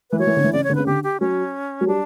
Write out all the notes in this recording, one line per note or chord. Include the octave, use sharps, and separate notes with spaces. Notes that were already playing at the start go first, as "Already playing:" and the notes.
E3 B4
F#3 C#5
E3
D3
E3
C#3 D5
C#5
D3
C#3 B4
D3 G4
G4
F#3 C#4
F#3
G3 D4